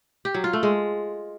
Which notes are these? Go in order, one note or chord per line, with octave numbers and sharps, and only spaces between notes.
G4
F#3
F4
A3
G#3